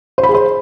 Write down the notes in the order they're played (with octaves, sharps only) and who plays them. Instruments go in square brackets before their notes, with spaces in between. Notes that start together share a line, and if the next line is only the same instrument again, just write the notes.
[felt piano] C5
B5
G#4
C5